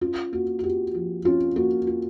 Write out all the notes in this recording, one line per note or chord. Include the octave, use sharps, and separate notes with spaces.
C#4 F4
A#3 F#4
F#4
F4 G4
F3
C#4 F4
A#3 F#4
F4